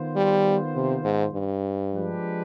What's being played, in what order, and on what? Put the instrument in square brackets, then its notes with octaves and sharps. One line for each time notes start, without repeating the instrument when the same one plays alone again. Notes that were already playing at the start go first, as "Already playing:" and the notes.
Already playing: [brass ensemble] D#3 B3 F4 C5
[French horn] G3
C3
G#2
G2
[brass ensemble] F3 G#3 D4 G4 B4